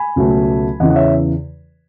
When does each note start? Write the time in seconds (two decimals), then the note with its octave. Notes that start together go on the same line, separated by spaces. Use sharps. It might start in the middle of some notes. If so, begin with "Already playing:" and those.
Already playing: G#5 B5
0.16 C#2 B2 F#3 A3
0.80 E2 C#3 E3 D#5 F#5
0.90 F#5
0.95 C#5 E5